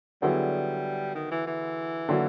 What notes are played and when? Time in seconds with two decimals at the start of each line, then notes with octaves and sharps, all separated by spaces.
0.22 D3 F#3 G3 B3 E4 G#4
1.15 D#3
1.31 E3
1.47 E3
2.09 D3 F#3 A#3